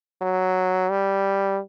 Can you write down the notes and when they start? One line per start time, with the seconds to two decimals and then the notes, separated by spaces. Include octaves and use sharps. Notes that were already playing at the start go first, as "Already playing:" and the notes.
0.22 F#3
0.89 G3